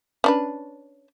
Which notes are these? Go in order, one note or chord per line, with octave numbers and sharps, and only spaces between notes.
C#4 D4 B4